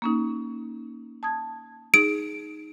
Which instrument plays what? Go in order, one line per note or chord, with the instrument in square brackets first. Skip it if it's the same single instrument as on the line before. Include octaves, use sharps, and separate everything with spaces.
[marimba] A#3 C#4 D#4
A5 D#6 G#6
[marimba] D#4 G#4 [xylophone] D7